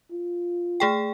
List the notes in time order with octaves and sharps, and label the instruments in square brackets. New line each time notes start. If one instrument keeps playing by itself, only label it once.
[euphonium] F4
[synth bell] A3 G#4 G5